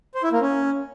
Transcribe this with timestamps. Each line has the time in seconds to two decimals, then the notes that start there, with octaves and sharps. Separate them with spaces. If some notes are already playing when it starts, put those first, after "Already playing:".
0.14 C5
0.23 E4
0.32 A#3
0.41 C#4